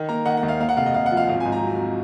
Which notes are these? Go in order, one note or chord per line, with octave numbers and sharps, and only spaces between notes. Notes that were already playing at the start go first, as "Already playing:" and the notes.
Already playing: D#3
A#3 A#5
D#3 F#5
F#5
D#2
F5
A#3 F5
F#5
F1 F5
D#5
F1 F5
F#5
F3
F5
G#1 F5
G#5
G#2
A#5
F#3